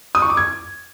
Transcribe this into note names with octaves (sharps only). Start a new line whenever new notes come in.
D#6
C#6
D6
G#6